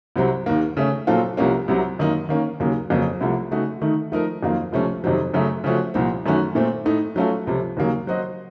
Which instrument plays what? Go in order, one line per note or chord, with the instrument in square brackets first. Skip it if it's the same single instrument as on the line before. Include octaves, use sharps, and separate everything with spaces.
[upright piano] C2 C3 F#3 C4
D#2 D#3 A#3
C#3 A3 C#4
A#2 F#3 C4 F4 A4
C2 C3 F3 A#3 C#4
C2 C3 F#3
F#2 D#3 A#3 D#4
D#3 A#3 C#4
D#2 C#3 F#3 A#3
F2 C#3 F#3 A#3
C2 C3 F3 A3
C#3 A3 D#4 F#4
D#3 A3 D#4
F3 A3 D#4 A#4
F2 D#3 F#3 A#3 F4
C#2 C3 F3 A3 C#4
F2 C3 D#3 F#3 C4
F#2 C#3 F#3 A3
C#3 F3 A3 C#4 F#4
C2 A#2 F3 C4
F#2 D#3 A3 C#4 F#4
A#2 A3 C4
A2 A3 D#4
F#3 A3 C#4 F4 A4
C#2 C3 F3
D#2 C#3 F#3 A#3
F#3 C4 F#4 C5 D#5